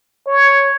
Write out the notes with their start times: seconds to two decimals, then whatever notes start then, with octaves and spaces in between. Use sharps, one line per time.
0.27 C#5